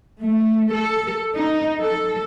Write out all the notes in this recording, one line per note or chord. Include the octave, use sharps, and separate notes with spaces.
A3
A4
D#4
A4